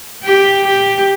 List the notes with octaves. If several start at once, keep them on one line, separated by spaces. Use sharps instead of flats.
G4
G4